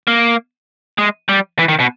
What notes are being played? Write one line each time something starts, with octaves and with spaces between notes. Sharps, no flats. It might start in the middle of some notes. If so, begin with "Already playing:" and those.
A#3
G#3
G3
E3
D#3
B2